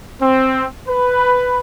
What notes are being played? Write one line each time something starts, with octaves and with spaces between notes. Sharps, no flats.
C4
B4